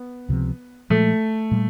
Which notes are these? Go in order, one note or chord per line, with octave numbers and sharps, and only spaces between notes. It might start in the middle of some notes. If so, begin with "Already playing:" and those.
Already playing: B3
C#2 C3 F3
A#2 F3 G#3 A3
A#2 G3